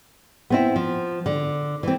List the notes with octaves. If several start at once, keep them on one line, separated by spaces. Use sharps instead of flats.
B3 C4 E4
F3
D3
E3 C4